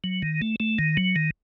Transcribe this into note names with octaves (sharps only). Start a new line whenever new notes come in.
F#3
D#3
A3
A3
D#3
F#3
D#3